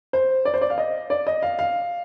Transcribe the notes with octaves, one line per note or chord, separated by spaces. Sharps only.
C5
D5
C5
D5
F5
D#5
D5
D#5
F5
F5